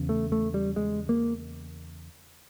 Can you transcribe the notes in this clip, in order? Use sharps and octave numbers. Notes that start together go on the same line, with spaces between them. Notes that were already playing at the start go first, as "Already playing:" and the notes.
Already playing: E2 C#3
A3
A3
G3
G#3
A#3